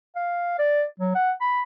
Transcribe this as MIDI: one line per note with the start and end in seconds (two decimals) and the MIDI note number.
0.16 0.57 77
0.59 0.84 74
1.00 1.14 54
1.15 1.32 78
1.41 1.63 83